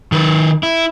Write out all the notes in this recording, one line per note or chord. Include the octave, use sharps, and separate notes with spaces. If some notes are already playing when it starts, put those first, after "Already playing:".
D#3 B4
E4